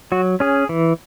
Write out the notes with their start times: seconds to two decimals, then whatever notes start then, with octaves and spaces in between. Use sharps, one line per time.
0.12 F#3 F#4
0.40 C#4 G#4
0.69 E3